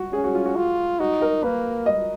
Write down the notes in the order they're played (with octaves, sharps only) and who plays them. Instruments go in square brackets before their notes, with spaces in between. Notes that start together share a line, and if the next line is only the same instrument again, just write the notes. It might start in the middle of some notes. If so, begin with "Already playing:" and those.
Already playing: [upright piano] F#4
[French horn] C#4 [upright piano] G#4
[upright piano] F#4
F4
F#4
[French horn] F4
[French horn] D#4 [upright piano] F#4
[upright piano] A#4
[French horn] A#3 [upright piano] B4
[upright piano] D#5